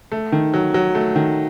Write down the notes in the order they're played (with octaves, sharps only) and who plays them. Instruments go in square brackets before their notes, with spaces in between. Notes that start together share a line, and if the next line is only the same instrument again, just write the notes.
[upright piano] A3
D#3
F#3
F#3
A3
D#3